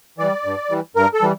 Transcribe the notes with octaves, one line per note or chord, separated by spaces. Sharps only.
E3 G3 D5
G2
E3 G3
G2 A#4
A4
E3 G3